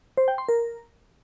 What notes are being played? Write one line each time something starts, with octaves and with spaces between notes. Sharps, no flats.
C5
G5
C6
A#4